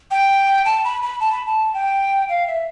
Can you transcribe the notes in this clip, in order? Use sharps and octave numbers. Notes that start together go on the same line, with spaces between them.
G5
A5
B5
B5
A5
B5
A5
G5
F5
E5